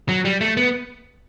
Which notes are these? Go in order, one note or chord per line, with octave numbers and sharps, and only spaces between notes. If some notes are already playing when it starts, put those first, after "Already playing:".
F#3
G3
A3
B3